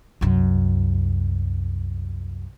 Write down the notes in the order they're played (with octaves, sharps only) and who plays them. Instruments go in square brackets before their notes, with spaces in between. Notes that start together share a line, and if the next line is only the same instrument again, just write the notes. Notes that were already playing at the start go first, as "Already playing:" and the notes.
[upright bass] C2 F#2